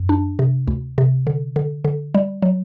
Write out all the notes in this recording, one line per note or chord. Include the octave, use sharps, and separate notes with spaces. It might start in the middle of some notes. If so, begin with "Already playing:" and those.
Already playing: F#2
D4
C3
D2
C3
D3
D3
D3
G3
F#3